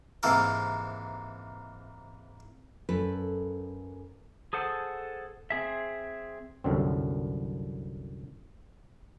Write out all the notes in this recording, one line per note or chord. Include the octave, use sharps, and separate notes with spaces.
G#2 C3 E3 A#3 A4 A#4
F#2 A4 B4
G#4 A4 C5 F#5
C4 G#4 E5
C2 F#2 D3 C4